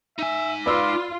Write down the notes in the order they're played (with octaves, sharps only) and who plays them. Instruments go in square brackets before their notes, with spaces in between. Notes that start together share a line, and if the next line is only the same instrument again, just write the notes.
[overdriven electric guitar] D#4 G#5 [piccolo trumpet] E5
[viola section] F4 [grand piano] B4 D5 E6 [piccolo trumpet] D6